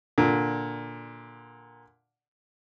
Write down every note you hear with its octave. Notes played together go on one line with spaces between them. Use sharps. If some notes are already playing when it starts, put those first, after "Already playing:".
A#2 D3